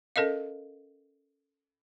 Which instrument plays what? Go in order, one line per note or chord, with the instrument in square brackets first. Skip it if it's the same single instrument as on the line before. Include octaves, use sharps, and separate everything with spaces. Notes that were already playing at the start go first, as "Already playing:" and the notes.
[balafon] C#4 A4 A#4 D#5 F5